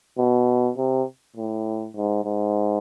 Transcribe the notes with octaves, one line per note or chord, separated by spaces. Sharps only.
B2
C3
A2
G#2
G#2